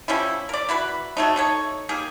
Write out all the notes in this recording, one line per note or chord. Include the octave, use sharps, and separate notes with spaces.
F3 G3 C#4 E4
A#4 D5
E4 F#4 B4
F#3 A3 D#4
D#4 A4 C#5
G3 A#3 D#4 G#4